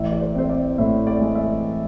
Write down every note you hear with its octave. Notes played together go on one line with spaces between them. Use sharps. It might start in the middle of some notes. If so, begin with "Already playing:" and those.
Already playing: A1 E5
D5
C5
C4 C5
D5
A2 E5
D5
G#3
E5